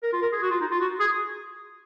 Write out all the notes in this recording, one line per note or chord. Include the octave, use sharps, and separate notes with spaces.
A#4
F4
A#4
G#4
F#4
F4
D#4
F4
F#4
G#4